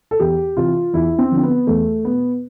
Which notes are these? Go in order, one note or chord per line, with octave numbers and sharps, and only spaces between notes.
A4
E2 G4
C3 E3 F4
E2 E4
C4
D3 F3
C4
B3
E2 A3
B2 B3